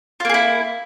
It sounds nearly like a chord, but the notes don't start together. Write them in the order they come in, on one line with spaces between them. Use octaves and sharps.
F4 A#3 G#4 E4